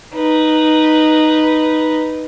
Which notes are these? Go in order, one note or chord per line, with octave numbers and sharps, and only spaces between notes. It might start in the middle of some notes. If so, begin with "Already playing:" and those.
D#4 B4